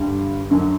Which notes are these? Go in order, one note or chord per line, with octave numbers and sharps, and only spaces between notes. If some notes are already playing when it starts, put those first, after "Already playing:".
Already playing: G2 D3 G3
F#2 D3 F#3